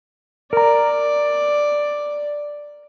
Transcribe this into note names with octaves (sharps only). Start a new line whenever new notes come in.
A#4 D5 A#5